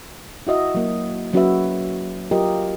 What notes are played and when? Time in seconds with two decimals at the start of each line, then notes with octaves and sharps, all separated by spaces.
0.47 E4 F#4 D#5 E5
0.75 F#3 A#3
1.33 F#3 C#4 F#4 G#4 B4 E5
2.31 F#3 F4 G4 A#4 D#5